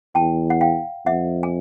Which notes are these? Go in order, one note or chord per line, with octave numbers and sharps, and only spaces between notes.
E2 G5 A5
F#5
F5 G5
F2 E5 F#5
G#5